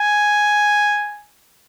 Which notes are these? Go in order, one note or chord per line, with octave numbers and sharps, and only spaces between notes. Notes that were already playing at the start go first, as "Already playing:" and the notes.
Already playing: G#5